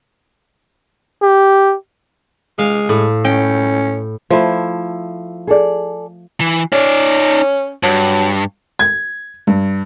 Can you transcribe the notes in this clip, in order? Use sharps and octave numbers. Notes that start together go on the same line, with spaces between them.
G4
G#3 F5
A2
C#4 G5
F3 A3 E4 C5
G#4 A4 D5
E3
C#4 D#4 D5
G2 F#3
G#6
G2